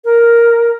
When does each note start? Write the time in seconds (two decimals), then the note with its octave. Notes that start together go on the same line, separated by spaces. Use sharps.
0.05 A#4